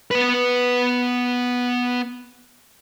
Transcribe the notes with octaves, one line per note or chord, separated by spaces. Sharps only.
B3 B4